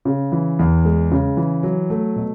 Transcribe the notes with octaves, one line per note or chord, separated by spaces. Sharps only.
C#3
E3
E2
G#3
C#3
E3
F#3
A3
B2